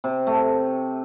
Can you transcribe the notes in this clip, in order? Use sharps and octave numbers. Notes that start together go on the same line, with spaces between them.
C3
A3